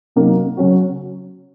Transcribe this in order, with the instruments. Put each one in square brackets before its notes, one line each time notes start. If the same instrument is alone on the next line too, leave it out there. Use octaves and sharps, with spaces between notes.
[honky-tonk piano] C3 F#3 A#3 D#4 F#4
C#3 F#3 C#4 F#4